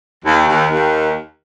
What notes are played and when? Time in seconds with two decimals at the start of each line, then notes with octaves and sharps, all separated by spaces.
0.25 D#2
0.48 D#2
0.69 D#2